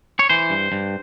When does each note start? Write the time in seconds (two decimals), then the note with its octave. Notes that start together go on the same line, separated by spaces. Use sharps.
0.19 C#5
0.29 E3 C5
0.50 G2
0.72 G2